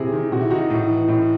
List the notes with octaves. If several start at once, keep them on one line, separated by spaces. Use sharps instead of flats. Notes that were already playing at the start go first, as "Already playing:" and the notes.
Already playing: C3 E4 G#4
D#3
C3 F#4
E4
D#3 D#4 F#4
A2
E3
A2